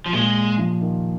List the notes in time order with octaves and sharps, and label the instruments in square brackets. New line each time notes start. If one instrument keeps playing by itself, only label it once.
[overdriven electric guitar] F3
[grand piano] A#2 [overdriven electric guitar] G#3
[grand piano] F3
D#3